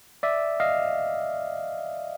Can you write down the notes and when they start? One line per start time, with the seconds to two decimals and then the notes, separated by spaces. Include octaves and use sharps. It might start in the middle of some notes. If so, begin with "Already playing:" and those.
0.23 D5 E5
0.60 D#5 F5